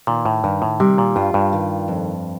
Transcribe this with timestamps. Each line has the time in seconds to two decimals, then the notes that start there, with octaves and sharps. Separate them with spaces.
0.07 A#2 D#3
0.25 A2
0.44 G2 D#3
0.62 A2
0.80 C3 G3
0.98 A#2
1.16 G2 F4
1.34 G2
1.53 D#3
1.88 F2